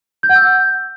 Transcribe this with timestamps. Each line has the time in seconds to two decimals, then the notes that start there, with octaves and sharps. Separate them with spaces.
0.23 G6
0.29 F#5
0.36 E6
0.42 G6